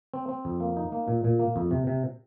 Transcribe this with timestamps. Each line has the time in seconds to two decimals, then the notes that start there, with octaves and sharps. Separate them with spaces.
0.14 C4
0.29 C4
0.45 F2
0.60 A#3
0.77 D#4
0.92 A#3
1.08 A#2
1.24 A#2
1.39 A#3
1.56 F2
1.71 C3
1.87 C3